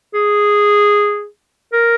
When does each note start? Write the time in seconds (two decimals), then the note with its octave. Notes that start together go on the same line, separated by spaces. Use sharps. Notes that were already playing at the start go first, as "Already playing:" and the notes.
0.14 G#4
1.73 A#4